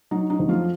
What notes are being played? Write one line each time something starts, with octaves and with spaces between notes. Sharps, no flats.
F#3 D#4
D#4
F2
F3 F4